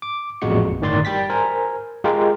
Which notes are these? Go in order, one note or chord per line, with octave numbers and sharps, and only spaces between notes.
D6
A1 F2 A#2 G#3 F#4 C#7
G1 A2 D#3 D5 C6 A6
G3 G5 A6 B6
A#4 C5 G#5
G#3 F4 G4 A#4 G5